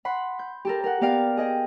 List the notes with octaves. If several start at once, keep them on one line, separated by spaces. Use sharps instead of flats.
F#5 B5 C6
G6
G4 A4 A#4
A#4 F#5
B3 G4 A#4 D5 F5 G5
G#4 D#5 G5